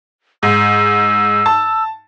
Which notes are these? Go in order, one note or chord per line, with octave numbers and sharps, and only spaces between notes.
G#2 E6
A5